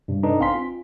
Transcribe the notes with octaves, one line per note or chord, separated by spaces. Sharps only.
G2 C3
D4 D#4 A4 B4
A1 C4 F5 G#5 C6 B6
F4